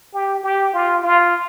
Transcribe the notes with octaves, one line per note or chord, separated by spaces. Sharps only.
G4
G4
F4
F4